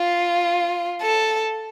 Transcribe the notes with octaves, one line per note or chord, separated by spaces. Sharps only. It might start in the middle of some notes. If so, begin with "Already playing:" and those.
Already playing: F4
A4